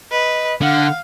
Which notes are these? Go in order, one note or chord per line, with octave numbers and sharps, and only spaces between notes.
B4 D#5
D3 F5 F#5